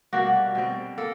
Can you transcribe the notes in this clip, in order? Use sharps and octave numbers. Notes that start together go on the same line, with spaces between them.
B2 G3 A#3 D4 F#4
B2 G3 C4
A#3 A4